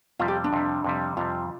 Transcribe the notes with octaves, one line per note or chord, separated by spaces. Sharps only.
F2 C3 G3 F4
G4
D4
F2 C3 G3
F2 C3 G3
F2 C3 G3 F4